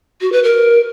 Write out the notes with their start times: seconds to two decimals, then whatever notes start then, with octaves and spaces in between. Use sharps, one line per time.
0.21 F#4
0.32 B4
0.44 A#4